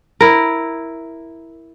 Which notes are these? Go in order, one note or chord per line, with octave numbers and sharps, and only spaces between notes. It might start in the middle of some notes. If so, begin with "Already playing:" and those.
E4 A#4